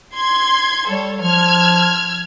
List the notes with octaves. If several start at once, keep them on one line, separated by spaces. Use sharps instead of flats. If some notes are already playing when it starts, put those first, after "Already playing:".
C6 G#6
G3 A4 C#5
F3 F6 G#6